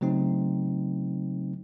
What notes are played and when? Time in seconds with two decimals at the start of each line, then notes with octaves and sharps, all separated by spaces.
0.01 C#3 F#3 A3 C4 D#4